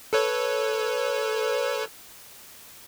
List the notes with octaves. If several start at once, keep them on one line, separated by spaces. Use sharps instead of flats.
A4 B4 C#5